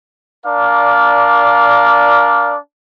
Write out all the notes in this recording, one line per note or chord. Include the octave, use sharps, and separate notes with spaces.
D4 A#4 D5 F5